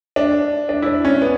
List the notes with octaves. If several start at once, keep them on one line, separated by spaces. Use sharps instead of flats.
D4
D4
E4
D4
C#4
B3